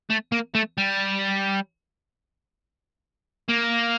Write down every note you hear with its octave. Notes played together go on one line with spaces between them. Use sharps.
A3
A#3
A3
G3
A#3